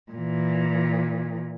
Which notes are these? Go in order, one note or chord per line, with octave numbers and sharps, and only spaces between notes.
A#2 E3